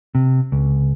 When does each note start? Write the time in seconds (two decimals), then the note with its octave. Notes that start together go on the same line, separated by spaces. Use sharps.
0.15 C3
0.52 C#2